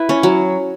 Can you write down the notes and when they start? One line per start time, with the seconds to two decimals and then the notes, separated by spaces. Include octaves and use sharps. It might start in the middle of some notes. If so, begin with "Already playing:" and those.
Already playing: E4 B4
0.09 C#4
0.23 F#3